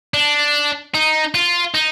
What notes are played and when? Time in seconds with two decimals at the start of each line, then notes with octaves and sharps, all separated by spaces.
0.14 D4
0.95 D#4
1.35 F4
1.74 D#4